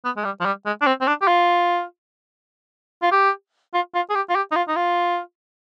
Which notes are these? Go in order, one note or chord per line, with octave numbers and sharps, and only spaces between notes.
B3
G#3
G3
F3
G3
G#3
D4
C4
C4
D4
G4
F4
F4
G4
F4
F4
G#4
G4
F4
G4
D#4
F4
D#4
F4